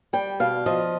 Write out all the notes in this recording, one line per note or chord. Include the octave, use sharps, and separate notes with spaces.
G3 G5
B2 F5
F3 D#5